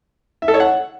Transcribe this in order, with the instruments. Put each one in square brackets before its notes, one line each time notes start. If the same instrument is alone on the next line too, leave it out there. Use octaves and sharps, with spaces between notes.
[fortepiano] E5
A4
C#5
F#5